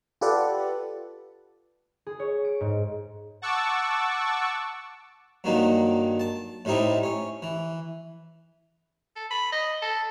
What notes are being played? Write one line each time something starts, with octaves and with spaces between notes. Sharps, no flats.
F4 G4 A4 B4 D5 F#5
G#4
C#5
D7
G#2
F#5 A5 C#6 D6 E6
G2 A#2 D#3 F#3 A#3
A5
A2 G3 C4 D#4 E4
C#4
E3
A4
B5
D#5
A4